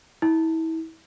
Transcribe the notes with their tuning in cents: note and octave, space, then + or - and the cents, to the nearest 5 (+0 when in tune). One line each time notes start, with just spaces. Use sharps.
E4 -30